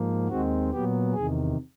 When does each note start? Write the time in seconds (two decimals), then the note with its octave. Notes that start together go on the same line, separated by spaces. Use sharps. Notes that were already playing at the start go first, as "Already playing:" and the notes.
Already playing: G#2 F3 A#3
0.28 D#2 D#3 G#3 C4 F#4
0.71 A#2 F#3 B3 G4
1.14 E2 C3 D#3 G#4